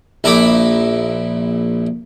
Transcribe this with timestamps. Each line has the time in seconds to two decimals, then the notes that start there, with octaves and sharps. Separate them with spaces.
0.24 A#1 E4 A#5 B5 D6